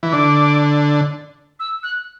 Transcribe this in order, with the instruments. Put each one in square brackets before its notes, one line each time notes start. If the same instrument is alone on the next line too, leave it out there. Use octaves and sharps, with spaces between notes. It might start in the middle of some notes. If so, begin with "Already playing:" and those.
[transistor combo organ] E3
[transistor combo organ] D3 [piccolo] D6
[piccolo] E6
F#6